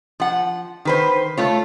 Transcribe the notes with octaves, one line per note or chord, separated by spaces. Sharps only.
F3 F#5
D#3 B4 C5
A3 F4 C#5